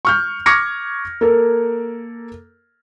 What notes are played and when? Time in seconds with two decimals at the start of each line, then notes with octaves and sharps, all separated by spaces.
0.05 C#6 F6 G6
0.46 C#6 D6 F6 G#6 A#6 C#7
1.21 A#3 A4 A#4